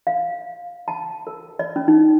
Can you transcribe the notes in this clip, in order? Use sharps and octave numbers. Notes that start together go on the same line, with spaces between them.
F5
A5
A#4
D5
C#4
D#4